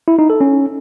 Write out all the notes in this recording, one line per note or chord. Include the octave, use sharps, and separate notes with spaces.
E4
D#4
A4
C#4